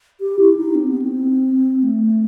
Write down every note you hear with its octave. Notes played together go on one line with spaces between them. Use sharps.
G4
E4
D#4
C4
B3
C4
A3